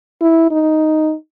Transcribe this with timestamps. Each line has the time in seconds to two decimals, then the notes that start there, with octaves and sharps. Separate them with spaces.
0.21 E4
0.51 D#4